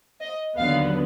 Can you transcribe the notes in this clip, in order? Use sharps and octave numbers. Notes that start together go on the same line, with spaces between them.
D#5
D#2 D3 F#3 B3 F5